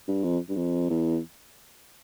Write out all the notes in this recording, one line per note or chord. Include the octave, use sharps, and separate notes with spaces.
G2
F2
G2
F2
E2